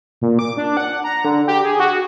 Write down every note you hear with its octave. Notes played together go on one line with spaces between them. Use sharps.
A#2
D6
D4
F#5
A#5
D3
G4
G#4
F#4